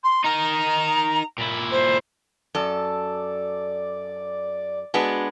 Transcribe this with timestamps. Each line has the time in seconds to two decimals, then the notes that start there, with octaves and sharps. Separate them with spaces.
0.04 C6
0.24 D#4 A#4 A#5
1.38 A#2 E4
1.71 C5
2.55 F#2 A4 D5
4.94 G#3 B3 D4 F#4